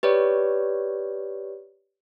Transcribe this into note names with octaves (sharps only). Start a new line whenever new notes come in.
G4 B4 C#5 D5